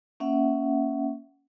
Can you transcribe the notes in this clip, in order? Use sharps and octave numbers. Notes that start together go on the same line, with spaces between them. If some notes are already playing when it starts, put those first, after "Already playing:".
A#3 C#4 E5 F#5